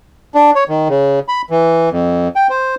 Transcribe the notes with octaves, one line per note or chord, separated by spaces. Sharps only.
D4
C#5
D#3
C#3
B5
E3
F2
G5
C5